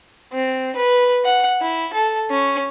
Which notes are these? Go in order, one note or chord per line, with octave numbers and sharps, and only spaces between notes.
C4
B4
F#5
E4
A4
C#4